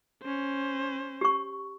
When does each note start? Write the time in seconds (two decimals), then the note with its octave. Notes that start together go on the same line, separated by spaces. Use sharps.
0.23 C#4 C5
1.21 G4 C#6